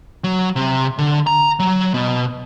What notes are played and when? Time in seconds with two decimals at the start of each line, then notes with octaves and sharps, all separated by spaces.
0.24 F#3
0.56 C3
0.98 D3
1.27 A#5
1.59 F#3
1.94 B2